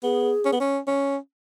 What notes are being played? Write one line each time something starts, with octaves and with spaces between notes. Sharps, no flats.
B3 G#4
C#4
B3
C#4
C#4